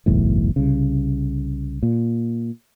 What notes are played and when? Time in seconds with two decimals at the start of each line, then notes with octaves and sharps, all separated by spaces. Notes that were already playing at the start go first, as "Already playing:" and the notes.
0.06 F#1 B1 E2 A2
0.56 C2 C#3
1.83 A#2